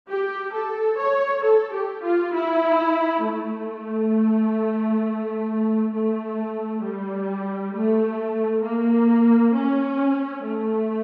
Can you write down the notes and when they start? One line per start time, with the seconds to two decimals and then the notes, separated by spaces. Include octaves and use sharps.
0.08 G4
0.53 A4
0.98 C#5
1.43 A4
1.73 G4
2.03 F4
2.33 E4
3.23 A3
5.93 A3
6.83 G3
7.73 A3
8.63 A#3
9.53 C#4
10.43 A3